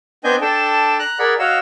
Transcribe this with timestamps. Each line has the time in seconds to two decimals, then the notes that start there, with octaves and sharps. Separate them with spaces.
0.24 B3 C4 D4 D#5 G#5 G6
0.42 D4 A4 G5 A5
0.99 A#5 F#6
1.19 G#4 A#4 D5 F#5 B5
1.39 F#4 C#5 D#5 F5 E6